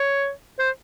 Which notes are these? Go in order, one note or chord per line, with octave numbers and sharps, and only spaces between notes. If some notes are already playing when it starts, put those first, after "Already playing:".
Already playing: C#5
C5